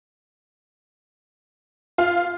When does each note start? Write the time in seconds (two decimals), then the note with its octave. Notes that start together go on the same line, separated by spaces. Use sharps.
1.98 F4